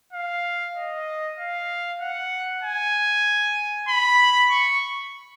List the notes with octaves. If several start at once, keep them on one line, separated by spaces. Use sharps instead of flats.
F5
D#5
F5
F#5
G#5
B5
C#6